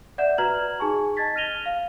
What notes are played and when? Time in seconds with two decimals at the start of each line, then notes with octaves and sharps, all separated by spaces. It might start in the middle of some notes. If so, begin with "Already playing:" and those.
0.18 D5 E5 F#5 G6 E7
0.38 F#4 B4 A#5 F6 G#6 F#7
0.80 D#4 G#4 G#5 A5 C#6
1.17 D#5 A5 G#6 A6 B6
1.36 F6 A#6 D#7 F7 G7
1.66 F5